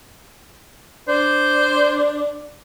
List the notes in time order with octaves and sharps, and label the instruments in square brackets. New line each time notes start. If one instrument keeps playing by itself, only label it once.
[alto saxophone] D4 [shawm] C5